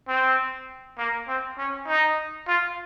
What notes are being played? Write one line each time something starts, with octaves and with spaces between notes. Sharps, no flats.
C4
A#3
C4
C#4
D#4
F4